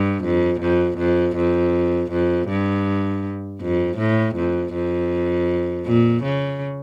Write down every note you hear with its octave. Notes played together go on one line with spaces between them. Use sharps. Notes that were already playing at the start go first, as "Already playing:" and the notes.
Already playing: G2
F2
F2
F2
F2
F2
G2
F2
A2
F2
F2
A#2
C#3